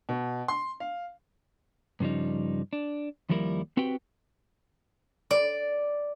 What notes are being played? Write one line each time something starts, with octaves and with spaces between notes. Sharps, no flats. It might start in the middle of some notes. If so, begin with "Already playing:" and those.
B2
C6
F5
G2 C#3 F3 G3 D#4
D4
D#2 F3 G3 E4 A#4
C4 F#4 G4 B4 G5
D5